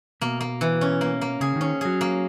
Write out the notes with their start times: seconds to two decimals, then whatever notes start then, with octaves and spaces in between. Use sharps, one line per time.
0.21 B2 A#3
0.41 A#3
0.61 E3
0.81 C#4
1.01 A#3
1.21 A#3
1.40 C#3 G#4
1.56 D#3
1.61 C#4
1.81 F#3 G#4
2.01 A#3